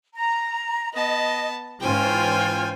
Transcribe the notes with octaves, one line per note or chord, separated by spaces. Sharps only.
A#5
B3 D#5 A5
G#2 E3 C#4 F4 C5 G5 G#5